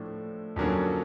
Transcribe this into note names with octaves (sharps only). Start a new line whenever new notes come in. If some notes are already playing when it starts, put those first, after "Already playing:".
Already playing: A2 F3 A3 D4
F2 D3 F#3 A#3 C#4